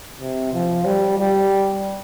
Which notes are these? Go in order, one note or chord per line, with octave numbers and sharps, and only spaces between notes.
C3
F3
G3
G3